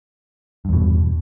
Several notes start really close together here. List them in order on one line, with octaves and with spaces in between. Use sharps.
G2 E2 B2